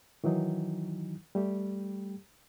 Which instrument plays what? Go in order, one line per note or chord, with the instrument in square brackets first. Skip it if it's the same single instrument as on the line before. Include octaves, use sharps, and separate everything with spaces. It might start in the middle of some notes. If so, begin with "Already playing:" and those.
[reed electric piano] D#3 E3 F#3 D#4
G3 A3 G4